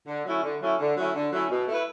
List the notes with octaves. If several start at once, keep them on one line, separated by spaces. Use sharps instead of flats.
D3
F#3 A3 C#4 E4
D3
F#3 A3 C#4 E4
D3
F#3 A3 C#4 E4
D3
F#3 A3 C#4 E4
B2
A3 E4 B4